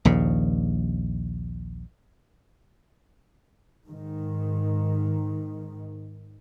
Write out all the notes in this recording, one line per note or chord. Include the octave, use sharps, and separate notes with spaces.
A#1 D#2 C#3
G#2 D#3